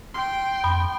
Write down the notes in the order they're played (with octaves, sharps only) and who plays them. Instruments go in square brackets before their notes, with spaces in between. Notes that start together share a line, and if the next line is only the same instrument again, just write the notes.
[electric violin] G5 [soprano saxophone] C6
[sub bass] F2 [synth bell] B5